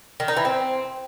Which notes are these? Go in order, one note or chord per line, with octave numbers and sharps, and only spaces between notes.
D#3
D#4
E3
C4